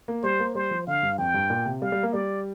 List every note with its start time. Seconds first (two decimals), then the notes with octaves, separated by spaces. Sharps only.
0.08 A#3
0.23 G3 C5
0.40 A#3
0.55 G3 C5
0.71 F3
0.87 D3 F5
1.03 G2
1.18 F2 G5
1.34 G2
1.50 A#2
1.66 C3
1.82 G3 F5
1.92 G3
2.03 A#3
2.13 G3 D5